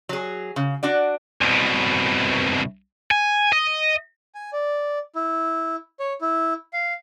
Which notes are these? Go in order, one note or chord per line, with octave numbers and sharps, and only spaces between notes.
F#3 G#4
C#3
D4 F#4 D5
C2 B2
G#5
D#5
G#5
D5
E4
C#5
E4
F5